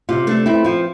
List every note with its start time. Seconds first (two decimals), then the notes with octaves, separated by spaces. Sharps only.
0.09 C3 F4
0.27 A3 D4
0.46 C4 E4
0.64 F3 F4